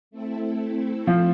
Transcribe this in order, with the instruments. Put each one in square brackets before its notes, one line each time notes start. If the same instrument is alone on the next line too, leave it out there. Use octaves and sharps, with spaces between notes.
[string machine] A3 C4 E4 A4
[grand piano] F3